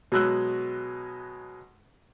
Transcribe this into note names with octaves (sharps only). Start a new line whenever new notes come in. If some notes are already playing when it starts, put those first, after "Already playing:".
B2 F#3 G#3 E6 F#6